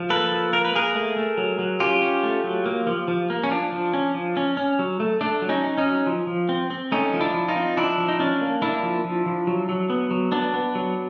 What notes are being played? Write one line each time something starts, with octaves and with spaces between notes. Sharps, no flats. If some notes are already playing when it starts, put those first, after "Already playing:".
Already playing: F3
A#3 A4 B4
F3
A#3 A#4
B4
A#3 G#4 A#4
A3
A3
F#3
F#3
C#4 F4 G4
C#4
A3
F#3
A#3
F3
F3
A#3
C#4
F3 D4
F3
C#4
F3
C#4
C#4
F#3
A3
A3 D4
F#3
C#4 D#4
C#4
C#4 D#4
F#3
F3
F3
C4
C4
A3 C#4 D#4
F3
D4 E4
F3
D#4 F4
C4
F3 D4 E4
F3
D#4
C#4 D4
A#3
A#3 D4 E4
F3
F3
F3
F#3
F#3
B3
F#3
B3 D4
B3
F#3